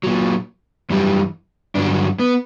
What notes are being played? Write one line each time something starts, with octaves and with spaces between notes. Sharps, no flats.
A#2 F#3
F#2 E3 G3
G2 D3 F#3 D4
B3